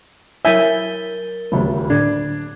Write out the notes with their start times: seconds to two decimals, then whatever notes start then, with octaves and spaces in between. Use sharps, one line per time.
0.45 F#3 E4 A#4 E5 G#5 G6 A6 G7
1.52 D#1 D2 C#3 F#3 A3 B5
1.90 A2 D3 D4 G#6